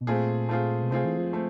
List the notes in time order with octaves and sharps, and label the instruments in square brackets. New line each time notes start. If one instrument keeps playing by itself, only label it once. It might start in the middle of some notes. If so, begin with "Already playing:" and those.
[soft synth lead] B2
[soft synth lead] A#2 [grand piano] A3 C4 F4 G#4
[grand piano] A3 C4 F4 G#4
[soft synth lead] B2
[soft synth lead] C3 [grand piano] A3 C4 F4 G#4
[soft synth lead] E3
F3
[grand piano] A3 C4